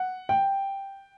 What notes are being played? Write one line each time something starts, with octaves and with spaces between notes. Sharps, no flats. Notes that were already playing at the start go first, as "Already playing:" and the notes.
Already playing: F#5
G5